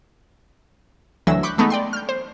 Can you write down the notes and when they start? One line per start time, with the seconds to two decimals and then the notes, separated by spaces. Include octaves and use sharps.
1.27 D2 E3 F#3 E6 A#6 E7
1.43 B5 C#6 D6 F#6 G6
1.58 G#3 A3 B3 D#4
1.70 D5 G5 C6
1.93 F6 G6
2.09 C5